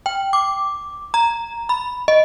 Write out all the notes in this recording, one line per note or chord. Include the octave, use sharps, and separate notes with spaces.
G5
D6
A#5
B5
D#5